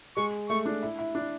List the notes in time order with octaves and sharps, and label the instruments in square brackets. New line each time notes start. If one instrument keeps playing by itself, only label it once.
[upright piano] G#3 [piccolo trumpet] C#6
[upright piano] A3 [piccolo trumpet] C#6
[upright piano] D4
E4
E4
D4